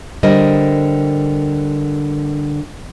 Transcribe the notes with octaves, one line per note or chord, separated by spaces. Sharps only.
D3 G3 A#4 C5 D#5